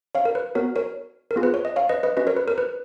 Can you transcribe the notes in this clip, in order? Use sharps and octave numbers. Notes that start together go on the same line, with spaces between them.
C#5 F5
A#4
B4
B3 F#4 A#4 C#5
A#4 C#5
A#4
B3 F4 G#4
B4
C#5
D#5
C#5 F5
B4 D#5
B4 D#5
C#4 F#4 B4 D#5
A#4 C#5
B4
A#4
B4